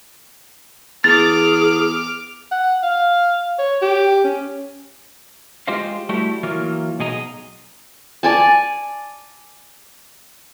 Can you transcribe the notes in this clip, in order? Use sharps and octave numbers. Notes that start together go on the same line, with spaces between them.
E2 G#4 D6 F6 A6
F#5
F5
C#5
G4
C#4
G#3 F4 G4 C5 D#5 F5
G3 A3 E4 F#4 G4
E3 F#3 A#3 F4
B1 B2 G#4 D#5 A#5
D5 G#5 A5